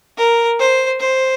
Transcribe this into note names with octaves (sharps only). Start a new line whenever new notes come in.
A#4
C5
C5